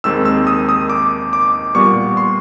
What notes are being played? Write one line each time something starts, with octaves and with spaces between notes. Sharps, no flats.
D#2 D#3 G#3 C4 E6
E6
D#6
D#6
D6
D6
A#2 G3 B3 C#6
C6